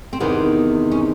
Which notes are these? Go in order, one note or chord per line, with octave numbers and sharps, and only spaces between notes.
C4
E2 C3 D#3 B3
C#4